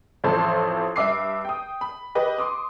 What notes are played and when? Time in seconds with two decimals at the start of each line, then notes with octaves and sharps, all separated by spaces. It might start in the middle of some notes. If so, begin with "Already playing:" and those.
0.24 A1 F2 A4 C5 A5 C6
0.96 G2 E5 D6 C7
1.45 G5 D#6
1.81 B5
2.15 G4 B4 D#5
2.38 C6 D6 D#6